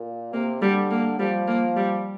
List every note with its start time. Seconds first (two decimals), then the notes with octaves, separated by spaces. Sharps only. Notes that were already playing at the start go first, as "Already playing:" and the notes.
Already playing: A#2
0.33 C3 A#3
0.62 D3 G3
0.91 A#3
1.19 F3 G3
1.47 A#3
1.76 G3